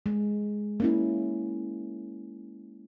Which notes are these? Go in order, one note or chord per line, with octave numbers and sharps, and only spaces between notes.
G#3
A#3 C#4 E4